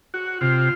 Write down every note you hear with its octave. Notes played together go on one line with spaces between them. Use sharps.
F#4
C3 F4